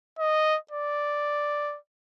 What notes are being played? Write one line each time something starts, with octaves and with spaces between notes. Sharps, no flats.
D#5
D5